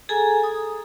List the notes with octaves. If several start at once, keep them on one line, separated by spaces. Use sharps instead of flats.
G#4 A4 G#5 A#5
D#6